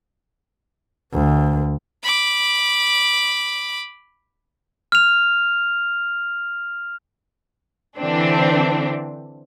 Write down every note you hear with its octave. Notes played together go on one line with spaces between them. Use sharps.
D2
B5 D6
F6 F7
D3 E3 C4 D4